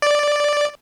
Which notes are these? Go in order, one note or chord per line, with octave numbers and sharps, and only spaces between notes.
D5